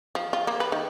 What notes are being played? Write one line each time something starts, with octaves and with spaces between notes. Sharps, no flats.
F3
F4
A#3
B4
D#3